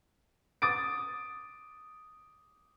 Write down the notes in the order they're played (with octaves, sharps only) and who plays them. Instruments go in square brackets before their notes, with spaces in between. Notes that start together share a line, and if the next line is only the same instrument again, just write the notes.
[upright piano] D6 D#6 A6 D7